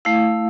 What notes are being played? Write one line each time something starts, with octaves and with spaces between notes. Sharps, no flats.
A3 E4 F5